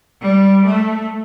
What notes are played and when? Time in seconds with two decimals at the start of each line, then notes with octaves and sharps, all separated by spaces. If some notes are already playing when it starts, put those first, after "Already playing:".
0.21 G3
0.64 A3